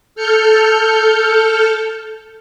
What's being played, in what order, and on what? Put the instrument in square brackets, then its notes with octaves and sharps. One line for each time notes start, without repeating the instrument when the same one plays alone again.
[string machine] A4 F6 G6 C#7